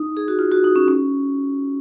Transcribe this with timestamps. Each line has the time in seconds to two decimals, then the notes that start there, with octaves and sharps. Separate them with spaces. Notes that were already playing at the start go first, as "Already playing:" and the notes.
Already playing: D#4
0.17 G#4
0.28 F#4
0.39 F4
0.51 F#4
0.64 D#4
0.76 C#4
0.88 C#4